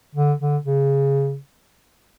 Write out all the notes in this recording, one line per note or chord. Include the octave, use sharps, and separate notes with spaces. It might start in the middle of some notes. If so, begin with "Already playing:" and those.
D3
D3
C#3